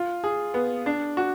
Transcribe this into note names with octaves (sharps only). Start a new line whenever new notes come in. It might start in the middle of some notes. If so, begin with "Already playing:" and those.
Already playing: F4
G#4
B3
D4
F#4